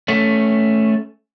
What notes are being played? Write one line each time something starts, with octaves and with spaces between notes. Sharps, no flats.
A3 C#4